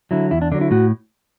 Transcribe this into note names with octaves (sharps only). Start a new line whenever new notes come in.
D3 F#3 E4
E2 E4
D4
D3 F#3 D4
E4
A2 F#4